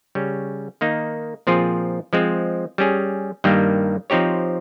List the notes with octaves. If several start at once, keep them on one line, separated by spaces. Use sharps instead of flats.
C#3 G3 C#4
D#3 A#3 D#4
A#2 F3 C4 F4 G#4
F3 G#3 C4
G3 C#4 G#4
G2 D#3 G3 A#3
F3 C4 D#4 G4 C#5